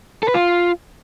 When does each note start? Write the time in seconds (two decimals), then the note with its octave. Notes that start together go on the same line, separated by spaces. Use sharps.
0.23 A4
0.28 B4
0.34 F4